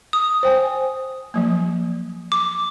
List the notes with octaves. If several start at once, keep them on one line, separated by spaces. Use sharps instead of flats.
D#6
C5 G5 G#5
F3 F#3 A#3
D6